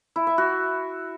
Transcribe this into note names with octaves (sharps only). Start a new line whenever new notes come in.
E4
E5
F#4